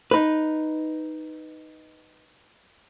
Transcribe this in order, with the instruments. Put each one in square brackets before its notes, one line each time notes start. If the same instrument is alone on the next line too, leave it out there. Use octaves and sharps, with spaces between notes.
[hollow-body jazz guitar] D#4 B4